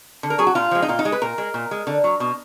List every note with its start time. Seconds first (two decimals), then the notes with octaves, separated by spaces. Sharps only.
0.23 D3
0.30 A#4
0.38 F#3 G#4
0.47 F#4
0.55 A#2 F4
0.71 F3 G#3
0.82 D#4
0.88 A#2 F4
0.99 D#4
1.05 G#3
1.12 B4
1.22 A#2 A#4
1.38 G#3
1.54 A#2
1.71 G#3
1.87 D3
2.04 F#3
2.20 B2